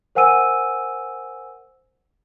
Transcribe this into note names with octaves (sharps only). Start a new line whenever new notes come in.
A#4 C5 F#5 G#5 E6 D#7